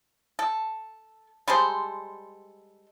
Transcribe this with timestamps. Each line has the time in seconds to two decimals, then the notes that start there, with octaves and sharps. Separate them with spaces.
0.39 A4
1.48 G3 G#3 A4 C5